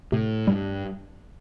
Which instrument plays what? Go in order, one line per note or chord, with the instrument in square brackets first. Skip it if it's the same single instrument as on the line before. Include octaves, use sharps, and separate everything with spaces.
[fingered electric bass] A2 [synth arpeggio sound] C3
[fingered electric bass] G2 [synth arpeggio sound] G3